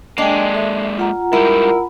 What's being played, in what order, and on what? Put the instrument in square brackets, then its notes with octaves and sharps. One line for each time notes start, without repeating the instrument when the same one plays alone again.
[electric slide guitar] G#3 A#3 [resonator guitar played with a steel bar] D4 [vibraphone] D#5 G5 G#5
[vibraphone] A4 E5
F4 F#5 A#5
[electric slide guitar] G#2 G3 [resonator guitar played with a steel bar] E4 [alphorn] A#4